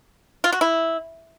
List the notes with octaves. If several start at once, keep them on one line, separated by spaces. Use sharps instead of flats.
F4
F#4
E4